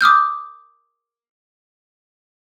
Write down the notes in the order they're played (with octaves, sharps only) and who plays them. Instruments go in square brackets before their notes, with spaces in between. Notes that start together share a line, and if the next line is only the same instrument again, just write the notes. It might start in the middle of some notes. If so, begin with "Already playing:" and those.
[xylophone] D6 D#6 F6 G6